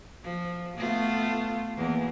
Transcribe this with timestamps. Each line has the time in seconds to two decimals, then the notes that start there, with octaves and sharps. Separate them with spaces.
0.24 F3
0.77 A3 B3 F4
1.77 E2 A#3